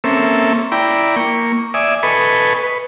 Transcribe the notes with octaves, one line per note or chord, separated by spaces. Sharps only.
A#3 C4 C#4 A4 E5
E4 D5 G5 A#5 B5
A#3 C#6
D5 E5 G#5 D#6
A4 B4 D#5 G#5 B5 C#6
B4